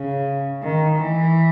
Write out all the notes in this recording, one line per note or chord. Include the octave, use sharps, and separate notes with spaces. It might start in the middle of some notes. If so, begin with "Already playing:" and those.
Already playing: C#3
D#3
E3